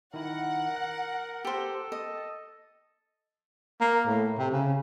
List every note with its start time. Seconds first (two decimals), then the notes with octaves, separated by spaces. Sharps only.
0.14 D#3 E4 A#4 F#5
0.76 F#6
1.44 G4 A4 C5
1.92 D#5
3.81 A#3
4.07 A2
4.38 C3
4.51 C#3